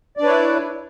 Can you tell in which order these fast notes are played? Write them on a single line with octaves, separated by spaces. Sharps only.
D5 D4 B4 C#5 E4